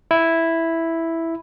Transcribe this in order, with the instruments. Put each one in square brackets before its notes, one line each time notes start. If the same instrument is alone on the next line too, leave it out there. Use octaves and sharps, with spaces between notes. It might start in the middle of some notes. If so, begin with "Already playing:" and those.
[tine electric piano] E4